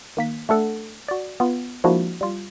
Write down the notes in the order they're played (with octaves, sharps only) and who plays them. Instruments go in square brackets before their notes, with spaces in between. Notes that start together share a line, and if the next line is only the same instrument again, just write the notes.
[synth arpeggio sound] D#3 A#3 B6
A3 D4 A4 F#5
F#4 D5
B3 F4
F3 G#3 A#3 D4 E4 F#4
G3 F4